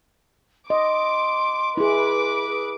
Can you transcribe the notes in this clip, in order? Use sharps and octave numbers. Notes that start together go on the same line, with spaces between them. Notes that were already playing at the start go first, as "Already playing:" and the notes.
D#5 C6 D6
E4 G#4 B4 D6
G#4